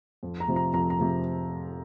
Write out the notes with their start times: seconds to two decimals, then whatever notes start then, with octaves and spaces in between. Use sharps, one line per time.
0.23 F2
0.40 A#5
0.48 C3 F3
0.56 A#5
0.73 F2 A#5
0.90 A#5
0.99 C3 F3